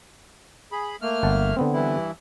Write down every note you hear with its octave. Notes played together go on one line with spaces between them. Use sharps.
G#4 B5
A3 A#3 F6
G1 F#5 A5
D3 B3 C4
G2 E3 E4